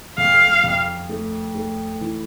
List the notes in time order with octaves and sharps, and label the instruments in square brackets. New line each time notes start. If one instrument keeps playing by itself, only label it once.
[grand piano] F2 [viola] F5
[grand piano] F2
A3
A3
E3